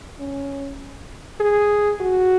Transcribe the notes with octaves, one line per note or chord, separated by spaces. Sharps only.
C#4
G#4
F#4